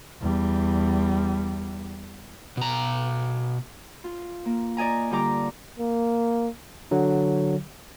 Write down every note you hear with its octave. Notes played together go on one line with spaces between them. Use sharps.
E2 G3
B2 A#5
F4
A#3
D5 D#5 G#5 A#5
D3 G3 F4 G4 A#5 D6
A#3
D3 F#3